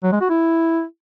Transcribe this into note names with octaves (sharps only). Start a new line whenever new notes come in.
F#3
G#3
F#4
E4